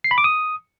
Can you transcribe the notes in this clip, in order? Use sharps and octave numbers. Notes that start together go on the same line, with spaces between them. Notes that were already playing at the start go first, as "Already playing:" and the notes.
C7
B5
D6
D#6